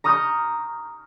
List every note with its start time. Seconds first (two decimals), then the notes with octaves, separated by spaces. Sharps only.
0.04 A#5 C#6 D#6 F6 G6